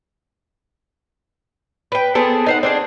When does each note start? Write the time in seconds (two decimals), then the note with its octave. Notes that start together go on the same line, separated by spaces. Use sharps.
1.92 B4 G5
2.15 B3 C4 G#4 A4
2.46 D#4 C5 F#5
2.63 C4 D4 G#4